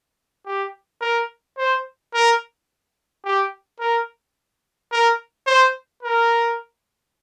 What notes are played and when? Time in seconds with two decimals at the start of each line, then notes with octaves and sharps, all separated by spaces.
0.46 G4
1.01 A#4
1.58 C5
2.14 A#4
3.25 G4
3.80 A#4
4.92 A#4
5.47 C5
6.03 A#4